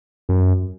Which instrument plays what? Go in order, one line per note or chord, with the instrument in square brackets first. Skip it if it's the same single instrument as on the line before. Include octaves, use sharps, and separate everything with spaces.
[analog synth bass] F#2